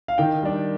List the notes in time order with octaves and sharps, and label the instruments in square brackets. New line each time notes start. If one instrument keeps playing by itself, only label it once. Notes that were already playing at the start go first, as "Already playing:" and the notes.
[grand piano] F5
D#3 G5
G3 D4